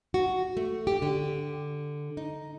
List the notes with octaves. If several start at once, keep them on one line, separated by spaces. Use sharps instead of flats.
F#4
A3
G4
D3
D#4